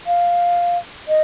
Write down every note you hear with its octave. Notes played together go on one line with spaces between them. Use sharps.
F5
D#5